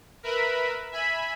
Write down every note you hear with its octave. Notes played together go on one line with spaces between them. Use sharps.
A#4 B4 E5 B5
E5 G#5 B5